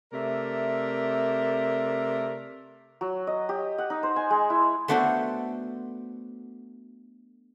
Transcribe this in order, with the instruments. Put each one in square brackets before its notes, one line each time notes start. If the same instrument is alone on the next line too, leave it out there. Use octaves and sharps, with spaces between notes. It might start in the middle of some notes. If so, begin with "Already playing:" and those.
[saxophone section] C3 A3 A#4 D5 E5
[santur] F#3
D#5
G4
F#5
D#4
C5
G#5
G#3
E4
[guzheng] A3 B3 D4 F#4 A4 C5